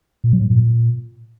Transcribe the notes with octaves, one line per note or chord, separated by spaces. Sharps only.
A#2
F#3
A2
A#2